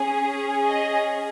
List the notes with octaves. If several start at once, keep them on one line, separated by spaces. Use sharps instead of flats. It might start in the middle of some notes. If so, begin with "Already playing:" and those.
Already playing: C#4 G#4
D#5